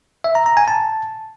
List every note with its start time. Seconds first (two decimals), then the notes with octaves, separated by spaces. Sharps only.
0.24 E5
0.35 A#5
0.46 A#5
0.57 G#5
0.68 A5